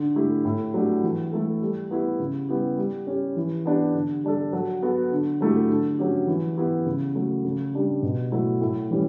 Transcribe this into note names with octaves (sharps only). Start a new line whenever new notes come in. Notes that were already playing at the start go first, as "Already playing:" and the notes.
Already playing: D3
A3 E4 G4
A2
F#3 A3 D4 G4
E3
A3 E4 A4
G3
B3 E4 G4
C#3
G3 B3 E4 G4
G3
C#4 G4
E3
B3 D4 G4
D3
G3 D4 A4
F#3
B3 F#4 A4
D3
F#3 A3 E4 G4
D3
F#3 C#4 G4
E3
B3 E4 G4
C#3
F#3 A3
C#3
G3 D4 G4
B2
F#3 A3 E4
A2
E3 G3 C#4